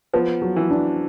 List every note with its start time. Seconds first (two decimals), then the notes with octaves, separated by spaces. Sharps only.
0.13 F3 B3
0.42 F#3
0.56 E3
0.70 D4